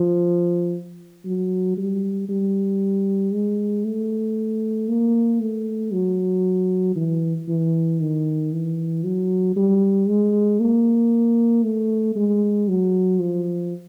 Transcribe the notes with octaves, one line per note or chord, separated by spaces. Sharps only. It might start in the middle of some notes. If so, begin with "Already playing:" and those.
Already playing: F3
F#3
G3
G3
G#3
A3
A#3
A3
F#3
E3
E3
D#3
E3
F#3
G3
G#3
A#3
A3
G#3
F#3
F3